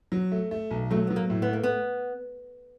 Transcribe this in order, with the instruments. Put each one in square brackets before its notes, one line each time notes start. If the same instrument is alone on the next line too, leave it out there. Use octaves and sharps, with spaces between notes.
[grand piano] F#3
A3
A3
B1
[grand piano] F#3 [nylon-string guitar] A3
[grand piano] F#3 [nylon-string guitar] B3
[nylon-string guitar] A#3
[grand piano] A2
[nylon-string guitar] B3
[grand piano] A3 [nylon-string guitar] A#3
[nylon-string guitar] B3